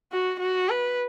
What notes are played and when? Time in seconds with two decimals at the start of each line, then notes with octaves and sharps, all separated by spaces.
0.12 F#4
0.40 F#4
0.69 B4